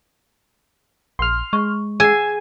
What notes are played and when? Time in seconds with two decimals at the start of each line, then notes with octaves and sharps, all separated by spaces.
1.19 A#1 C6 F6
1.53 G#3 C#6
2.00 G#4 F#5 G#5 E6 G#6